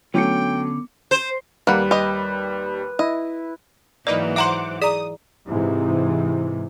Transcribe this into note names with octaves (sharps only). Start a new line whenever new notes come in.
D3 F#3 A3 B3 C#4 G5 D6 C#7
C5
D#2 G3 A#3 B4 F#5
G4 B4 D#5
E4 D#5
G#2 E3 F#3 A#3 D#4 B4 D5
C5 E5 F#5 A#5 C6 D6
G#4 D5 A#5 D#6
G#2 C3 E3